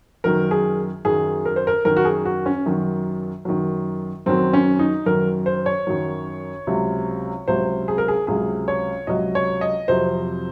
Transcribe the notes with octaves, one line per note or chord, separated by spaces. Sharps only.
F#2 D#3 F#3 A#4
G#4
F#2 D#3 F#3 G#4
A#4
C5
A#4
F#2 D#3 F#3 A#4
F#4
G#4
F#4
C#4
F#2 D#3 F#3
F#2 D#3 F#3
F#2 D#3 F#3 C4
C#4
D#4
F#2 D#3 F#3 A#4
C5
C#5
F#2 D#3 F#3
C#2 C3 F#3
C#2 C3 F#3 C5
G#4
A#4
G#4
C#2 C3 F#3 G#4
C#5
C#2 C3 F#3 D#5
C#5
D#5
F2 C3 F#3 C5